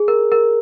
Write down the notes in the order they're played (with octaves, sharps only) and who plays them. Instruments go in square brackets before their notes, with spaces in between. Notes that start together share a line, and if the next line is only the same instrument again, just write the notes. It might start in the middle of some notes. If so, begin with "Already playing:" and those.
Already playing: [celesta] G#4
A#4
A#4